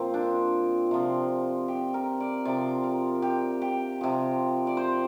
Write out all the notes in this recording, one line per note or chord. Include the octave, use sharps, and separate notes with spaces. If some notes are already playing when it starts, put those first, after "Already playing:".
Already playing: A#2 F3 C4
D4
C3 F3
G4
A#4
D5
C3 F3 D5
A#4
G4
G4
C3 F3
D5
C5